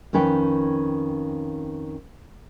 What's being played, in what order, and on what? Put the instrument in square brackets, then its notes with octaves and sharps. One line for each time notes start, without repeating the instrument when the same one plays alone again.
[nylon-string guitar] F2 D#3 C#4 B4 C#5 G5